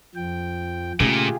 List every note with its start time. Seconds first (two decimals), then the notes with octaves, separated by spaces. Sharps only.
0.15 F2 F3 G5
1.00 A#2 C#3 A3 F4 G4 G#4